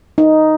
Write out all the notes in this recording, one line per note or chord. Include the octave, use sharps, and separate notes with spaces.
D#4